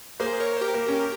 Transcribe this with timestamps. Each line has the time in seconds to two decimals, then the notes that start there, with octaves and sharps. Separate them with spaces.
0.20 A#3 G#4 C5
0.40 A#4 C#5
0.56 C5
0.61 G4 A#4
0.74 A#3
0.89 C#4